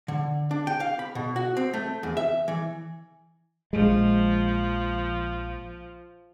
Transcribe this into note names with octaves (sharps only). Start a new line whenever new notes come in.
D3
D4
G5
F5
B5
B2
F#4
C4
A3
E2
E5
E3
A#1 F3 G#3